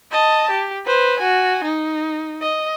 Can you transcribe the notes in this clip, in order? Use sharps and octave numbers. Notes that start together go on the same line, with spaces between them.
D#5 A5
G4
B4 C5
F#4 G#5
D#4
D#5